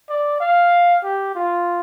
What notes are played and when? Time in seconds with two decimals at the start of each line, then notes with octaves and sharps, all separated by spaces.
0.09 D5
0.40 F5
1.04 G4
1.35 F4